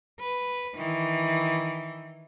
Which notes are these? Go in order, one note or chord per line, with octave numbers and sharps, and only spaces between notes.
B4
D#3 E3